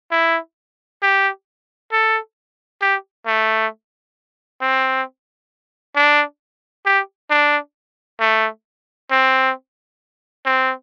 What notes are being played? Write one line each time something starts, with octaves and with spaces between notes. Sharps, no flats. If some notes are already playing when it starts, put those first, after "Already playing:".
E4
G4
A4
G4
A3
C4
D4
G4
D4
A3
C4
C4